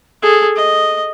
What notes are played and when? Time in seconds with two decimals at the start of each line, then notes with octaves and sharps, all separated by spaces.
0.23 G#4 A4
0.56 D#5